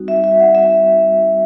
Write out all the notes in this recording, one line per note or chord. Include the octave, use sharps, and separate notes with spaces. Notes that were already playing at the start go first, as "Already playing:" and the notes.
Already playing: G3 C4 D#4 F#4
E5
E5
F#5
E5